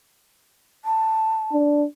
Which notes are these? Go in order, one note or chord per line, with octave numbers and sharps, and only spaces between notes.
A5
D4